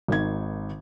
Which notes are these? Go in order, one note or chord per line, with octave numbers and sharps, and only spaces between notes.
G#1 D#3 G#6